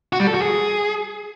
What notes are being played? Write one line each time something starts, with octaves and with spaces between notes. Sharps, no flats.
F#4
G3
A4
F#4
G#4